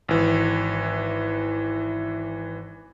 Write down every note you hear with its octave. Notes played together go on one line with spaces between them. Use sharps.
G#1 E3